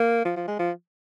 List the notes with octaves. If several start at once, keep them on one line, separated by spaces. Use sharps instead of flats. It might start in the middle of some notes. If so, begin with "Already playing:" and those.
Already playing: A#3
F3
F3
G#3
F3